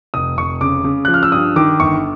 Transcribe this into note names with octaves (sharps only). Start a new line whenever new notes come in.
F1 D#6
F1 C#6
C#3 D6
C#3
F3 F#6
F6
E6
G2 D#6
D#3 D6
G1 C#6